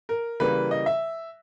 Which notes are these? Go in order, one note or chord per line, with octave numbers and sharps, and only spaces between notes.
A#4
C#3 E3 G3 A#3 B4
D#5
E5